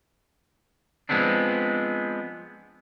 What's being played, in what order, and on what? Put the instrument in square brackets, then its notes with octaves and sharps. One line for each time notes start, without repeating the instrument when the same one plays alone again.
[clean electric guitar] F3 G#3 B3 C4 D4